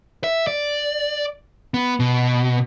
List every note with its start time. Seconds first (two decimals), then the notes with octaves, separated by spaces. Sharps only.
0.24 E5
0.47 D5
1.74 B3
2.00 B2